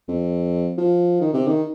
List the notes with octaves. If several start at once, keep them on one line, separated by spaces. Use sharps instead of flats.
F2
F3
D#3
C3
D#3